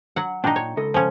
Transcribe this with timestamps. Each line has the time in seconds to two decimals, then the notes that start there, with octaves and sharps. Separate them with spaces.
0.16 F#3 F#5
0.44 A#2 D4 D#4 G5 A#5
0.56 C#5
0.77 C#2 A4 D#5
0.94 F3 C#4